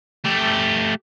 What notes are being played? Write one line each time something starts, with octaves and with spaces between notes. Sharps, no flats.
A3 G4